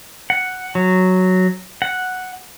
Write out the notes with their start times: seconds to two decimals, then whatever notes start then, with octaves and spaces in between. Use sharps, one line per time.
0.30 F#5
0.75 F#3
1.82 F#5